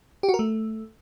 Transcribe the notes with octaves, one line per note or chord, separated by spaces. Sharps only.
G4
F#4
A#4
A3